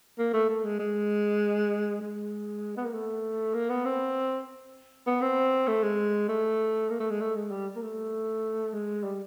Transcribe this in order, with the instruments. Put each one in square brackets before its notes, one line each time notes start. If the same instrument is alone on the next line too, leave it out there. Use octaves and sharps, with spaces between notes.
[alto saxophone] A#3
A3
A3
G#3
G#3
G#3
B3
A#3
A3
A#3
B3
C4
B3
C4
A3
G#3
A3
A#3
A3
G#3
A3
G#3
G3
A#3
A3
G#3
G3